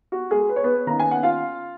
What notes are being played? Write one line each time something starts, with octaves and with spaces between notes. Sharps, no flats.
F#4
G#3 G#4
B4
C#5
B3 B4
D#3 A#3 C#4 A#5
G#5
F#5
F4 F5